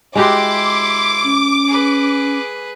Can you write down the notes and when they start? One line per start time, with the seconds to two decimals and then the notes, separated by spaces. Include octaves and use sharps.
0.15 G#3 E4 F#4 G4 C6 D6
1.24 C#4
1.67 G#4 B4